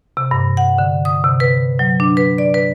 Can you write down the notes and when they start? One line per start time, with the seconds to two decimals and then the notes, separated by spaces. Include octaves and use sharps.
0.17 C3
0.31 G2
0.57 F#5
0.78 D3
1.05 D#6
1.24 C3
1.40 B4
1.79 F#3
2.00 D4
2.17 B4
2.38 D5
2.54 B4